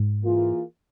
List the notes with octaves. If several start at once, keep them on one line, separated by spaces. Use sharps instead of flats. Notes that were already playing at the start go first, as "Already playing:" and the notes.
Already playing: G#2
E3 A#3 F4 G#4